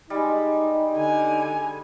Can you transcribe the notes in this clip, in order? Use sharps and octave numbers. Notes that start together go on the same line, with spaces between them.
G3 G#3 D#4
D3 G#5